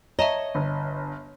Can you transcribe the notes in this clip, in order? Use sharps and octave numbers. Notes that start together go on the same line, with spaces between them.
C#5 D#5 E5 A5 A#5
G1